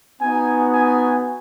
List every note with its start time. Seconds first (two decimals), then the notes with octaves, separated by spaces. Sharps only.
0.21 B3 D#4 F#4 G#5
0.74 G#5